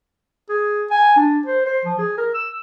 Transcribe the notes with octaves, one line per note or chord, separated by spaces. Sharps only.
G#4
G#5
D4
C5
C5
F3
G#4
A#4
E6